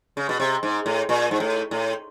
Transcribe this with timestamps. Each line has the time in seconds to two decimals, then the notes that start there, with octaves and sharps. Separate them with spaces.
0.17 C#3
0.29 B2
0.40 C3
0.63 G#2
0.86 A2
1.09 A#2
1.31 G#2
1.40 A2
1.71 A2